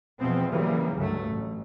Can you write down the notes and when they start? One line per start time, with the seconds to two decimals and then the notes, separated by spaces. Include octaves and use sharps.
0.19 E2 B2 F3 B3 C4
0.51 C#3 E3 F#3 G3 A#3
0.96 C#2 G2 F#3 A3
1.28 A1